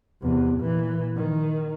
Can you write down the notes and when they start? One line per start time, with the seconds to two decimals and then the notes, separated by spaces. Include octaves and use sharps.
0.22 E2 C3
0.60 A#2 E3
1.16 D#3